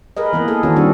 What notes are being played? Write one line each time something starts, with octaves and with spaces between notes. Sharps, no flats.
G#4 A#4 B4 D#5
E3 A#3 B3
G#4 A4
D#3 E3 C#4 F#4 A4
G3 C4 D4 F#4 G#4